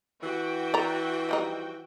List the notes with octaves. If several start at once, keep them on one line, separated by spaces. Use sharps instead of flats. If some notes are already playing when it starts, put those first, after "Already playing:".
E3 F#4 G5
D5 A#5
F3 G3 D#4